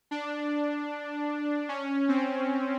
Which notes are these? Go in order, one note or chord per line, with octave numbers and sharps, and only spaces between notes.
D4
C#4
C4